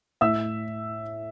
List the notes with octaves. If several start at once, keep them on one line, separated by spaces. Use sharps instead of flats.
A2 E5 E6